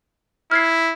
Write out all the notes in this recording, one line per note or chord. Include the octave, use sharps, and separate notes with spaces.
E4 F6 G#6 C7